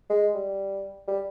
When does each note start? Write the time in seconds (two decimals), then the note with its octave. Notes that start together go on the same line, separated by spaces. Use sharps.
0.10 G#3
0.34 G3
1.08 G3